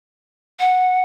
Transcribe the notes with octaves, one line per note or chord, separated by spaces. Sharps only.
F#5